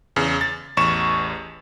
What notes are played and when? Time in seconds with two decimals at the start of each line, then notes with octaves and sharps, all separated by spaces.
0.16 E2 C#3
0.41 A6
0.77 A1 E2 C#6 E7